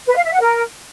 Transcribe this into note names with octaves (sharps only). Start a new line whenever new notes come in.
B4
F5
E5
F#5
A#4